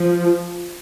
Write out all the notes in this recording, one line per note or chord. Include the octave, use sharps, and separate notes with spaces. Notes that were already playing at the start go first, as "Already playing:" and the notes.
Already playing: F3